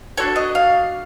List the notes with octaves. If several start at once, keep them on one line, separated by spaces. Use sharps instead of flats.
D4 F#4 A4 C#5
D#5
F5